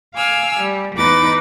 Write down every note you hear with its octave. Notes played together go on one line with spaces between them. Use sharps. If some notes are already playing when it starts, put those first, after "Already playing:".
F5 G#5 D6 E6 F6
G3
E2 D#4 B4 D6 A6